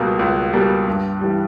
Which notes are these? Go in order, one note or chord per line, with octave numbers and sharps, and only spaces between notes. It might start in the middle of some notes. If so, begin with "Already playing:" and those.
Already playing: C#2 B2 G3 A#3
C#2
B2 G3 A#3
G2
E3 G3